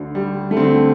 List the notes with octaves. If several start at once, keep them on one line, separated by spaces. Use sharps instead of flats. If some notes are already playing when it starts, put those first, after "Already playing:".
Already playing: D2 D3
G3
A3
D2 D3 C4